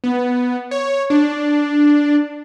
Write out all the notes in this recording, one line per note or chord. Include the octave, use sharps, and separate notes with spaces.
B3
C#5
D4